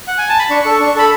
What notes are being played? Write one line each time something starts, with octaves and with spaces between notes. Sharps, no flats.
F#5
G#5
A5
B5
D4 C#6
A4
D4
A4 B5